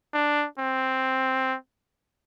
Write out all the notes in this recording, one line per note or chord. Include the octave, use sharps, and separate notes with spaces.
D4
C4